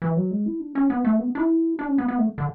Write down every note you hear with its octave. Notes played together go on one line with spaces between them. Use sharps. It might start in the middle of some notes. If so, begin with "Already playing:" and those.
E3
F#3
G#3
E4
D4
C#4
B3
A3
B3
D4
E4
D4
C#4
B3
B3
A3
D3